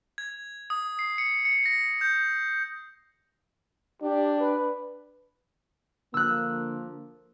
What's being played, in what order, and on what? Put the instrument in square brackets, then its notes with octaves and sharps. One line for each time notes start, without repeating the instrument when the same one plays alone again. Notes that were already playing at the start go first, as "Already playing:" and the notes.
[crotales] G#6
D#6
C7
C#7
C#7
A#6
G6
[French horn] D4 [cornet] G4
[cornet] B4
[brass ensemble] D3 F3 A#3 [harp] E6 F#6